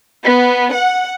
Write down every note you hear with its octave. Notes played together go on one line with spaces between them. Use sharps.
B3
F#5